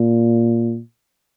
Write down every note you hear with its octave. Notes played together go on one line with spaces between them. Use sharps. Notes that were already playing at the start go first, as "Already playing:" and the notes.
Already playing: A#2